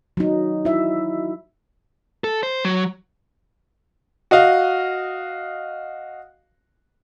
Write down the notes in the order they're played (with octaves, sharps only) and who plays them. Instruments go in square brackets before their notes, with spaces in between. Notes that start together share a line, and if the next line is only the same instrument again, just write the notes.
[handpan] F#3 D#4
E4 E5
[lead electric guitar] A4
C5
F#3
[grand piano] F#4 D#5 F5